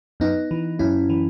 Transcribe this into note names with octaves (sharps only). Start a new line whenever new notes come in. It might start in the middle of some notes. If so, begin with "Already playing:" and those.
F#2 B3 D#4
E3
F#2 C#4 E4
E3